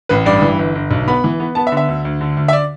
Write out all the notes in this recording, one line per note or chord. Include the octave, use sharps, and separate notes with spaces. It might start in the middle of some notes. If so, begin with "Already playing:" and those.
A1 B4
G2 D5
E3
G1
G1
B1
B3 B5
E3
B3
B3 A5
E5
D3
E5
D2
D2
D3
D2
E5
D5